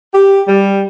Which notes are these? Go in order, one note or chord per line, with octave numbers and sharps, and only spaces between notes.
G4
G3